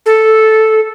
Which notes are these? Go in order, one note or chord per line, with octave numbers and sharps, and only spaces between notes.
A4